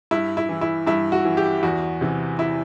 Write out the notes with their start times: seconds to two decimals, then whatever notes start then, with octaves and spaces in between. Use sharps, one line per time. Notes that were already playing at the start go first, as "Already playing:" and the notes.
0.11 G2 E4
0.37 E4
0.49 E3
0.61 E4
0.87 G2 E4
1.12 F#4
1.25 E3
1.37 G4
1.63 E2 F#4
2.01 C3 E3
2.39 E4